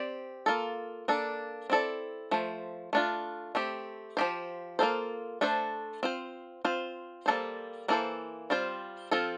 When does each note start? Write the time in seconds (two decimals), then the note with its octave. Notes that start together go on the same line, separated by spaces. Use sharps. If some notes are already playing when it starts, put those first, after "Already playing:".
Already playing: C4 G4 D5
0.46 A#3 F4 A4
1.08 A#3 D4 A4
1.70 C4 E4 A4 D5
2.31 F3 A3 C5
2.93 A3 D4 F4
3.55 A3 C4 G4
4.17 F3 C4 G4 C5
4.79 A#3 D4 F4 A4 C5
5.41 A3 D4 A4 C5
6.03 C4 F4 C5
6.65 C4 F4 C5
7.26 G3 A#3 D4 A4 C5
7.88 E3 A#3 E4 A4 C5
8.50 G3 C4 F4 C5
9.11 F3 C4 F4 A4